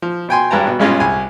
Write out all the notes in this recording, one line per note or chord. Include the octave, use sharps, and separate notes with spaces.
F3
B2 G5 G#5 C6
G#1 G2 B4 G5 A5 A#5
B2
B1 G2 G#3 C#4 F4
C2 G#5